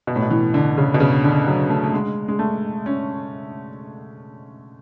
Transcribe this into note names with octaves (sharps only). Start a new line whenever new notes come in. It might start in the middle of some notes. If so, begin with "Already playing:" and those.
B2
A2
B2
E3
D3
C#3
B2
C#3
D3
F#3
A3
A3
G#3
G#3
A3
C#4